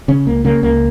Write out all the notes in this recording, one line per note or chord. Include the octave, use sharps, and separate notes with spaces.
C#3 C#4
C#2 A#3
C#3 A#3
C#2 A#3